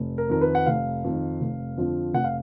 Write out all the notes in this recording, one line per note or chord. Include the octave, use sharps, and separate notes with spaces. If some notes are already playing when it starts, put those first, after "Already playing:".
Already playing: F1
A#4
F2 D#3 A#4
B4
F#5
F1 F5
F2 D#3
F1
F2 D3 F3
F1 F#5
F5